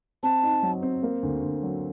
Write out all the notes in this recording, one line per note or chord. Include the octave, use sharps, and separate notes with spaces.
C4 A5
D#4
F#3
C4
A#3
D2
D2
F#3